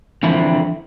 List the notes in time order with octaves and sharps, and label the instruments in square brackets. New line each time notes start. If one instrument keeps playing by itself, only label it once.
[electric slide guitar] D3 E3 F3 C4 E4 E5